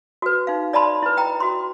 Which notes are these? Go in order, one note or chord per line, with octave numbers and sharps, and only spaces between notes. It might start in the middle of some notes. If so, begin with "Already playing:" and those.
F#4 B4
D#4 F5
D5 D#5 A5 B5 C6
E4 B4
D#5 G5 A#5
F#4 C6